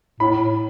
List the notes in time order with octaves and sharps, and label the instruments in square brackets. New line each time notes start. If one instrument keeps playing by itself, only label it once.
[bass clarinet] A2 [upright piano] B5